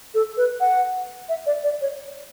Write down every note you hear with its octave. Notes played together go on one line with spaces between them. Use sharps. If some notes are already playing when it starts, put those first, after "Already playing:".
A4
B4
F#5
E5
D5
D5
C#5